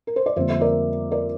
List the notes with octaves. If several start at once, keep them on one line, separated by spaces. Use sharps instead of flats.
A#4
C5
D5
F2 D3 G3 A#3 C5 E5
E5
A#4 D5
A#4 D5